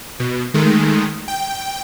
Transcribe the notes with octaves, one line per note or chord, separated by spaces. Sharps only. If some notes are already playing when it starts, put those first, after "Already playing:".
B2
D#3 G#3 A3
G5